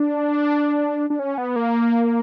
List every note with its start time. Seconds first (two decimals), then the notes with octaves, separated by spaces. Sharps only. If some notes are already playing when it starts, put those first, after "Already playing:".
Already playing: D4
1.10 D4
1.19 C#4
1.38 B3
1.56 A#3